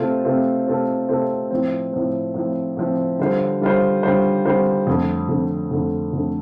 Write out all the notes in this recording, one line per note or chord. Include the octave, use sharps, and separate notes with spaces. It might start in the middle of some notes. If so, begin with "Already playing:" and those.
Already playing: C3 A3 C4 F4 A4
C3 A3 C4 F4 A4
C3 A3 C4 F4 A4
C3 A3 C4 F4 A4
A2 F3 C4
A2 F3 C4
A2 F3 C4
A2 F3 C4
D3 G3 F4 C5
D3 G3 F4 C5
D3 G3 F4 C5
D3 G3 F4 C5
F2 D3 A3
F2 D3 A3
F2 D3 A3
F2 D3 A3